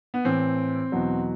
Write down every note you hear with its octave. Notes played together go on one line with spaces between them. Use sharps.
B3
A2 E3 C4
E2 B2 F#3